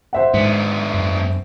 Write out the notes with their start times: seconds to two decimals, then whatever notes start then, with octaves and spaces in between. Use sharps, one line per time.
0.13 C5 E5 F#5
0.34 G#2 B3 D4
0.94 F#2